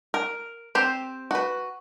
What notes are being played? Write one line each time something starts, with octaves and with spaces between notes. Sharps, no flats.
A#4
C4 G4 C5
F#4 B4